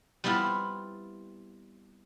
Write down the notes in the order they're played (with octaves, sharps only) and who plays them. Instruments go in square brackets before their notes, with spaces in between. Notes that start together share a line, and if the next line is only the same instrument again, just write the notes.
[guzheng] G3 B3 C4 E4 F4